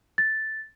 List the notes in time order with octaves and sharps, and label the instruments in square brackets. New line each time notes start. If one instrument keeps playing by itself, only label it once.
[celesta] A6